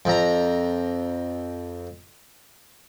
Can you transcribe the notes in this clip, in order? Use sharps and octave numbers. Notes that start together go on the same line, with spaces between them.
F2 A#5